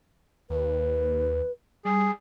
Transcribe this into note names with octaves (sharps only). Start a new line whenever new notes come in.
D#2 B4
G3 G#4